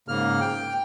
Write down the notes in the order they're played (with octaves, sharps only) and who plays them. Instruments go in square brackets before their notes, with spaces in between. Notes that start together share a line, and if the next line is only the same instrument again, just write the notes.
[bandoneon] G#2 C#3 A#3 F6
G5